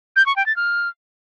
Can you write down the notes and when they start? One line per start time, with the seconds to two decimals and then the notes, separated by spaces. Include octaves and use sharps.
0.16 G6
0.26 C#6
0.36 G5
0.46 A6
0.56 F6